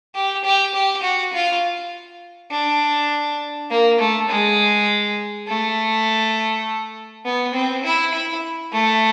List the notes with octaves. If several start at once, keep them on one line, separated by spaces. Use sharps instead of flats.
G4
G4
G4
F#4
F4
D4
A#3
A3
G#3
A3
B3
C4
E4
E4
A3